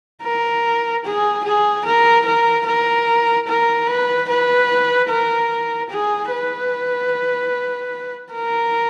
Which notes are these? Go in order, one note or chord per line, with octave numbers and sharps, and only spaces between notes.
A#4
G#4
G#4
A#4
A#4
A#4
A#4
B4
B4
A#4
G#4
B4
A#4